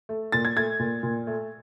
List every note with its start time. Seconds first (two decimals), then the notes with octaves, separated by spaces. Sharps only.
0.09 A3
0.32 A#2 A6
0.45 G#6
0.56 A3 G#6
0.79 A#2
1.03 A#2
1.27 A3